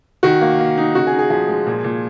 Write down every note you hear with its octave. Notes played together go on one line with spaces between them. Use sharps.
D#3 F#4
A#3
A#3
D#4
C#3 F#4
G#4
D#4
G#4
F3 G#4
G#3
A#2
A#2